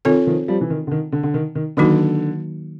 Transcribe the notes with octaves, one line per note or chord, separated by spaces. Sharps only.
D#3 C4 F4 A4 C#5
D#3 F3
F3 G3
E3
D#3
D3
D#3
D3
D3
D#3
D#3
D3 D#3 F#3 A#3 D#4 F#4